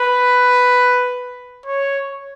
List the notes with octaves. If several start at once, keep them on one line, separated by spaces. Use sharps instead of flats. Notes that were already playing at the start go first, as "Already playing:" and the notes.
Already playing: B4
C#5